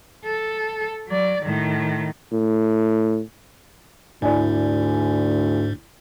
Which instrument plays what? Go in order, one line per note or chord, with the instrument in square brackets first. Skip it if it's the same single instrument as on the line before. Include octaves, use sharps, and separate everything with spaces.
[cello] A4
F#3 D5
A2 D#3
[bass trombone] A2
[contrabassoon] D2 [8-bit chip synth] G#2 [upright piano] E4 D5 G#5